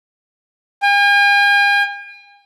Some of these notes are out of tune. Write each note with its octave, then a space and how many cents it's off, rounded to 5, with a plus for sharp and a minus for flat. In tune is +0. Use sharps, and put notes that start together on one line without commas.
G#5 -45